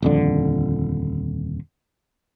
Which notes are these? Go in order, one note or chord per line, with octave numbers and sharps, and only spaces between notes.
D#1 F2 D3